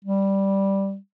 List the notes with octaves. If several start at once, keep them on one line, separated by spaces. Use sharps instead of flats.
G3